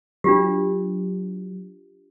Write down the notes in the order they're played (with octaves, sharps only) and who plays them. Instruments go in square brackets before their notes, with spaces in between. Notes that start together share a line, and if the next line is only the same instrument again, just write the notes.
[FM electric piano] F#3 [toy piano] D4 F4 G4